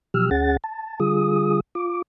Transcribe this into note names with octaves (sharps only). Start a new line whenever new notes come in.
B2 F3 F#3 G4 E6 F6
D2 C#4 G#4 F#5 A6
A5
D3 G3 F4 G#4 D#6
F4 D6